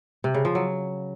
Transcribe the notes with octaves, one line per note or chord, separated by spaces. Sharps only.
C3
C#3
F3
F#3